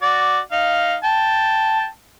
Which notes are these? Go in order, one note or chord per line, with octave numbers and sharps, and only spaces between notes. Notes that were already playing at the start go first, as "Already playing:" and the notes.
F#4 D5
D#4 F5
G5 A5